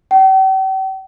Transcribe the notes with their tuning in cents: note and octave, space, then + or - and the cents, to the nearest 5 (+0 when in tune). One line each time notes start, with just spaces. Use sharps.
G5 -45